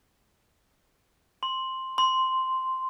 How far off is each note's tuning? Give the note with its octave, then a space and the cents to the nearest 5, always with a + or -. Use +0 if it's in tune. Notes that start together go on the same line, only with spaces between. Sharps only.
C6 +5
C6 -5